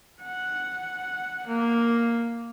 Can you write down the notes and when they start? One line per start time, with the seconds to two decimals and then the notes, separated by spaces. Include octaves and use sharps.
0.22 F#5
1.47 A#3